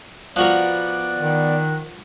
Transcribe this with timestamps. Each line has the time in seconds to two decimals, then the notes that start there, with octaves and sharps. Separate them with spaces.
0.36 F3 B3 F#4 A#4 D5 F#6
1.19 D#3